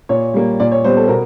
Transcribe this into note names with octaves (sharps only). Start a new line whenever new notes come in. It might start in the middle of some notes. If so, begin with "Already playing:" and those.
A#2 C#5
G3 A#3
A#2 D5
C#5
G3 B3 C5
A4
B2 A#4